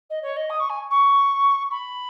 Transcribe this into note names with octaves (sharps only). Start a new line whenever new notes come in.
D#5
C#5
D#5
D#6
C#6
G#5
C#6
B5